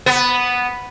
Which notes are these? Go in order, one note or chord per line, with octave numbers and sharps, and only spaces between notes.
B3